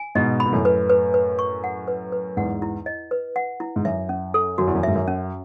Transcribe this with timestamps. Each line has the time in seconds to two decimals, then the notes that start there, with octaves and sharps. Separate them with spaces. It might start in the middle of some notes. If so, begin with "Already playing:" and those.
Already playing: G#5
0.15 G#2 B2 D#5
0.40 B5
0.46 B2
0.53 F#2 A2
0.65 B4
0.89 B4
1.14 B4
1.39 C#6
1.64 F#5
1.88 B4
2.12 B4
2.37 E2 G#2 F#5
2.62 E4
2.86 D#5
3.11 B4
3.36 F#5
3.60 E4
3.76 G#2
3.85 F#2 E5
4.09 C#4
4.34 A4
4.58 F#2 F#4
4.67 E2
4.75 F#2
4.83 G#2 E5
4.95 F#2
5.08 C#4